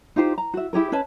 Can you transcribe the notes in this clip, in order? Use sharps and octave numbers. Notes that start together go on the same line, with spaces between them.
D#4 F4 G4 C5
A#5
F#4 E5
E4 G4 G#4 A#4
C#4 B4 D#5 A5